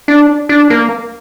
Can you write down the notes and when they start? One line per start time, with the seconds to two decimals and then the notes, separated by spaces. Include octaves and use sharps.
0.08 D4
0.49 D4
0.70 A#3